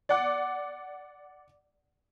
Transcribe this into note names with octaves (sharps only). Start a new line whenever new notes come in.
D5 F#5 D6